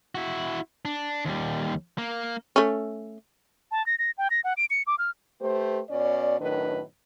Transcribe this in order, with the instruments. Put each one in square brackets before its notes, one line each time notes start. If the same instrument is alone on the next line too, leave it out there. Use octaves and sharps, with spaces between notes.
[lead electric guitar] E4 F#4
D4
D#2 G3
A#3
[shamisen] A3 C#4
[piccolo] A5
A#6
A#6
G5
A#6
F#5
D7
C#7
D6
F6
[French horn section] A3 G4 B4 C5
B2 C#4 D5
F#2 A2 D#3 D4 B4